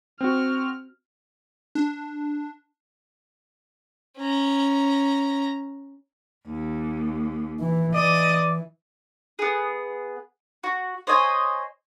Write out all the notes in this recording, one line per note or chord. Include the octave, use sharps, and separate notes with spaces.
C4 F#4 F6
D4
C#4 A#5
D#2
E3
E3 D5 D#5
B3 G#4
F#4
C5 C#5 D#5 G#5